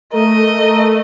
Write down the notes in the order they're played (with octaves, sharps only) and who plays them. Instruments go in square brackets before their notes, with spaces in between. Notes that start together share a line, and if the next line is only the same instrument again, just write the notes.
[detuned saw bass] A3 [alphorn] A#4 [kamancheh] D#5